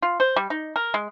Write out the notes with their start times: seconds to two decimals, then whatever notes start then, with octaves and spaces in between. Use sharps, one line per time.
0.02 F4
0.20 C5
0.36 G3
0.50 D#4
0.76 A#4
0.94 G#3